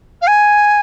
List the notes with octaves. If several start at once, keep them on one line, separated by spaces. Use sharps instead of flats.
F5
G#5